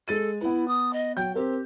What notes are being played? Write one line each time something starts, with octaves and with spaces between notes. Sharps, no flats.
G#3 A4 A6 D#7
B3 E4 B4
D#6
D#5
F#3 G5 G6
C4 G4 A#4